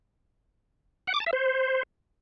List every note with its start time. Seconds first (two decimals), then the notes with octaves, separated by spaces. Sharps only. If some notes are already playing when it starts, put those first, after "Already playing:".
1.07 F#5
1.14 D6
1.20 A5
1.26 E5
1.33 C5